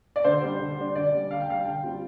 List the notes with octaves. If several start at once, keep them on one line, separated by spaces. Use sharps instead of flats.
D5
D3 C5
G3 D4
D3
G3 D4
D3 D5
G3 D4
D3 F5
G5
G3 D4 F5
D3 G5
G3 C4 F4